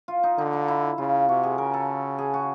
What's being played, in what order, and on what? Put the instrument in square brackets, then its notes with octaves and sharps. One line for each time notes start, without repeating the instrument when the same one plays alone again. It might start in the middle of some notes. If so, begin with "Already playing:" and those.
[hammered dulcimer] F4
D#4
[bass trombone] D3 [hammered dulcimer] D#4
[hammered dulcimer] D#4
E4
[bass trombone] C#3 [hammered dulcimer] F4
[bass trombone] C3 [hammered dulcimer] F#4
[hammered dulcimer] G#4
[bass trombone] C#3 [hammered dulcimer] A#4
[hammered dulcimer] A4
G#4
F#4